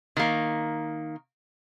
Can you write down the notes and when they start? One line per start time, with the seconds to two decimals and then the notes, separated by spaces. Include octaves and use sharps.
0.17 D#3 A#3